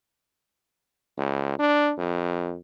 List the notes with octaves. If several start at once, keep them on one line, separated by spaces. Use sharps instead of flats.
C#2
D4
F2